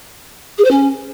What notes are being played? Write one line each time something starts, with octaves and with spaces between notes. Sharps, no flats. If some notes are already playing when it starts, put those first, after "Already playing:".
G#4
C5
C#4